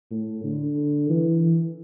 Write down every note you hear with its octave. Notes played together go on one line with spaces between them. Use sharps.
A2
D3
E3